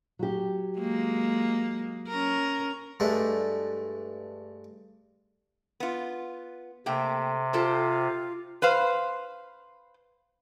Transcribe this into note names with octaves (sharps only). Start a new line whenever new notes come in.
F#3 G4
G#3 A#3
C#4 A#4
G2 G#3 A3
B3 F4
C3 A3 A#3 G5
F4 G4 A4 C5
B4 C5 F5